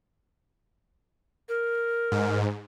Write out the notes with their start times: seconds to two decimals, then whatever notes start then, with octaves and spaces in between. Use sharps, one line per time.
1.49 A#4
2.12 G#2